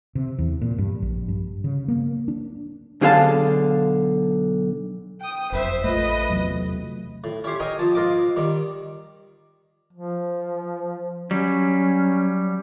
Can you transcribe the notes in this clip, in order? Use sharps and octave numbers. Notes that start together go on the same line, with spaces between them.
C3
E2
A#2
G2
A#1
G2
C#3
A#3
D4
B1 D3 G#4 C5 F5 A5
G5 D#6
F#1 F2 C5 E5
A1 A3 F4 B4 D#5
E2 C3 F#3 A3
A2
C#4 E4 G4 C5 C#5
A#4 C#5 D#5 G5 G#5 A#5
F3 A5
G#2 F4 A#4 D#5 D6
D#3 G3
F3
F#3 G3 C#4